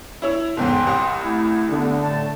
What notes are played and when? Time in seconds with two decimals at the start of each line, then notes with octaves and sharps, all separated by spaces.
0.22 E4 C#5 E6
0.57 G1 E2 G#2 F#5 G5 C6
0.86 C2 D#6
1.24 A3 E4
1.69 D3 A3 B3 D4
2.02 A2 A3 A5